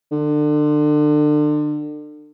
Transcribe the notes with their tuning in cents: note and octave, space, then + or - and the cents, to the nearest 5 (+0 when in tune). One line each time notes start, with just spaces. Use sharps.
D3 +30